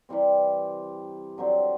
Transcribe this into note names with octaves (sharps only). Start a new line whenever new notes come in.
C3 E3 G3 C4
D3 F#3 C4